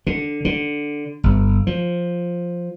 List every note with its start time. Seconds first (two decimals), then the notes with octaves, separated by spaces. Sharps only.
0.07 D3
0.45 D3
1.24 G1
1.67 F3